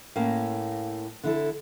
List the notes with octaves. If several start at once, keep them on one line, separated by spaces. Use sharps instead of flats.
A2 A#3 C#4 F5
D3 E4 A4